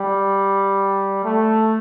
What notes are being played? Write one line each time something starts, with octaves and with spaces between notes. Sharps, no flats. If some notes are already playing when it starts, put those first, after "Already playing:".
Already playing: G3
A3